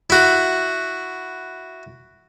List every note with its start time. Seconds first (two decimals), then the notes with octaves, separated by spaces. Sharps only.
0.10 E4 F#4